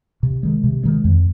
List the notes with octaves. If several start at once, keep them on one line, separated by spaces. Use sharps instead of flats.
C3
D#3 G#3
C3
D#3 G#3
F2